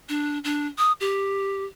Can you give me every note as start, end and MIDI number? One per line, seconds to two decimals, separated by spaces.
0.09 0.39 62
0.44 0.67 62
0.78 0.92 87
1.00 1.65 67